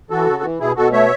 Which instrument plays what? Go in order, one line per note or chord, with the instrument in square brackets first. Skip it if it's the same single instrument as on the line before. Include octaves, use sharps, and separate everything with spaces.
[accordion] E3 F#4 A4
C#3
E3
B2 E4 G#4
B2 F#4 A4
A3 C#5 E5